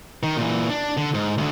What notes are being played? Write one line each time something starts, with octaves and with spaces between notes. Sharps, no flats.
D#3
A#2 E3
D4
D3
G#2
D2 D3